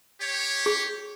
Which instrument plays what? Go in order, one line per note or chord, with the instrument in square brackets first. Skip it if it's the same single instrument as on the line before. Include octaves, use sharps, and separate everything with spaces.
[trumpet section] G4 C#5
[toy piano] G#4